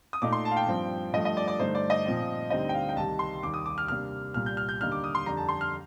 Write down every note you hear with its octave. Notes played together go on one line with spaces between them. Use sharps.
D#6
A#2 A3 D#4 D6
C6
A5
F5
G5
G2 F3 C4
G2 F3 A3 D#5
D#5
D5
D5
G2 D3 A3 D#4 C5
D5
D#5
A#2 F3 C4
D2 D3 G3 C4 D#4 D#5
G5
F5
G5
C2 C3 D#3 G3 A5
C6
D#2 D#3 G3 D6
D#6
D6
F6
C3 G3 A#3 D4 F6
C2 A#2 G3 F6
G6
F6
G6
D#2 D3 G3 A#3 D#4 F6
D6
D#6
C6
F2 D3 G3 A#5
A5
C6
F6